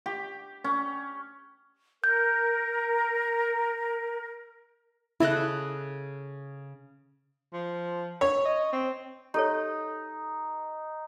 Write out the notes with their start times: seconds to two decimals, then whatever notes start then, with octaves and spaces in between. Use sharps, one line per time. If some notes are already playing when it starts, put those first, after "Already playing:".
0.06 G4
0.64 C#4
2.04 A#4 G6
5.20 C#3 E4 A4 D#5 F#6
7.53 F3
8.21 C#5
8.45 D#5
8.72 C4
9.34 D#4 G4 A4 C#5